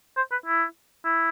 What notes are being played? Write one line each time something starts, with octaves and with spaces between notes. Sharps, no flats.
C5
B4
E4
E4